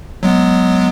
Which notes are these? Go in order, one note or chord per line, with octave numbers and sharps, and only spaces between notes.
F#3 G#3 B3